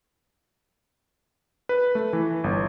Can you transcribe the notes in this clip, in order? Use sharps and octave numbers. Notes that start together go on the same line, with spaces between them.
B4
A3
E3
G1